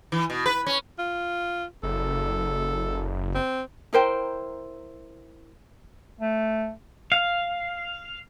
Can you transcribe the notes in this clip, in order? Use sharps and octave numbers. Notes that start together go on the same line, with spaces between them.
E3
B2
B4
C#4
F4
F#1 A4
C4
E4 A#4 C5 G5
A3
F5